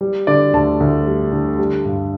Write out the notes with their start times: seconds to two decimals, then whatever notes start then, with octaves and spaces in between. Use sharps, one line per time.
0.01 G3
0.27 D3 D5
0.53 D2 A5
0.80 D2
1.07 G3
1.32 D3
1.58 G3
1.85 G2